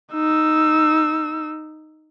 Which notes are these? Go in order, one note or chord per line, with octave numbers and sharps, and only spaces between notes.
D#4 E6